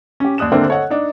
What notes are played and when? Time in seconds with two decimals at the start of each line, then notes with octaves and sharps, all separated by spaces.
0.20 C#4 G4
0.38 D#2 D5 D#6 F#6 E7
0.52 D#2 D3 A3 A#3 C4 D4
0.69 A4 C#5 D#5 F#5
0.90 D4 D#4